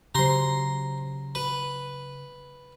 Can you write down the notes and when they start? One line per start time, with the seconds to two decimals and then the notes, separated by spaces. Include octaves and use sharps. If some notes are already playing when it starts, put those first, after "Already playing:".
0.15 C#3 F#3 G4 C5 A#5 C6
1.35 B4